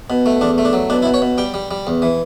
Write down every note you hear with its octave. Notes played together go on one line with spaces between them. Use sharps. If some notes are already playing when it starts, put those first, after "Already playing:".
B2
A3
E2 D4
A3
D4
F#3
B2 D4
E4
B2
C#5
B2
G3 G5
G3
G3
E2
E3